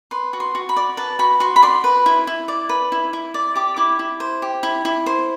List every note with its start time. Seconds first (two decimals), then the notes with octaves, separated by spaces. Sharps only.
0.11 B4 C6
0.33 F#4
0.40 C6
0.55 F#4
0.69 B5
0.76 D5
0.97 B4 A5
1.19 F#4 B5
1.40 F#4 C6
1.56 B5
1.62 D5 C6
1.84 B4
2.06 E4
2.27 E4
2.48 D5
2.69 B4
2.92 E4
3.13 E4
3.34 D5
3.56 G4 D6
3.76 E4 D6
3.99 E4
4.20 C5
4.42 G4
4.63 E4
4.85 E4
5.06 C5